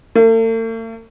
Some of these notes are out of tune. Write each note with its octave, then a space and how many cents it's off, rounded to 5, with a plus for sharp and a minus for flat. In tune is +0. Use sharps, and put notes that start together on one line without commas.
A3 +45